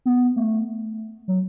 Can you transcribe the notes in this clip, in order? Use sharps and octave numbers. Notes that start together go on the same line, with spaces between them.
B3
A3
F#3